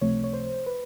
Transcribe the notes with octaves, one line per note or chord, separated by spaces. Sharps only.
C#2 C3 F3 A3 C4 C#5
C#5
C5
B4